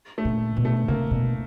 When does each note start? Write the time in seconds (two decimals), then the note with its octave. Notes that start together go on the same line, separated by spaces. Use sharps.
0.18 A3
0.25 A#2
0.56 B2
0.65 A3
0.88 C3 A#3
1.11 B2